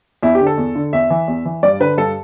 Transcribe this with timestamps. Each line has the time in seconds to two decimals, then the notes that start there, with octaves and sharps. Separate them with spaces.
0.23 E2 E4
0.35 G4
0.41 D3
0.47 A4
0.58 E2
0.75 D3
0.93 E2 E5
1.10 E3
1.28 E2
1.45 E3
1.63 G2 D5
1.80 D3 B4
1.98 G2 A4